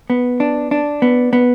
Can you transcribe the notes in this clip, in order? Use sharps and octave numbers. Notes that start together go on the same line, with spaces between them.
B3
D4
D4
B3
B3